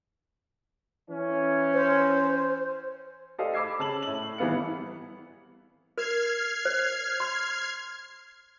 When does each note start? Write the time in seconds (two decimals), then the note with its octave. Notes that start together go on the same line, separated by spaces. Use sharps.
1.10 E3 C#4
1.74 C5
3.38 G4 A4 C5 D5 D#5 F5
3.54 B5 D6 E6 G#6 C7
3.79 C#3 A5 E6 F#7
4.03 A2 F#7
4.38 G#1 E3 G3 B3 F5 C#7
5.98 A#4 F6 G#6 C7
6.65 C5
7.20 C6